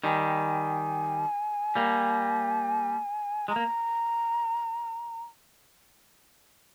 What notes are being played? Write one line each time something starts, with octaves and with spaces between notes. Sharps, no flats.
D#3 G3 G#5
G3 A#3
G#3 A#5
A#3